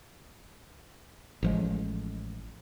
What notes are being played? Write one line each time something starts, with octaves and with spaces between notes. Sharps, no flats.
A1 F3 G#3